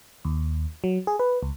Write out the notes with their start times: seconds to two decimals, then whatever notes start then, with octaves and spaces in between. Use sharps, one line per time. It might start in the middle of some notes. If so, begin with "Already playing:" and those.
0.25 D#2
0.84 F#3
1.07 G#4
1.19 B4
1.43 C#2